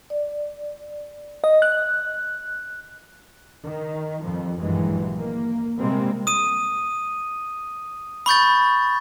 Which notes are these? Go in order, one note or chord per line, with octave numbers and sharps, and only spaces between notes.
D5
D#5
F#6
D#3
F2 F3 G3
A#1 G2 D#3 E3 F#3 G#3
A#3
C3 G3 G#3 A#3 C4
D#6 D#7
B5 C#6 G6 A6